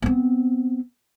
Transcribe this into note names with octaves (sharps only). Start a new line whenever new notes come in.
B3 C4